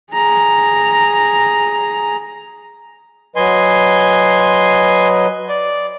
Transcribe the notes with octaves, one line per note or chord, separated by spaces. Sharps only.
G#4 A#5
F#3 B4 D#5 G#5 C6
D5